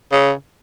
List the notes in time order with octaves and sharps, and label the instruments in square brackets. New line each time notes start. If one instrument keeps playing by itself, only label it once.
[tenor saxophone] C#3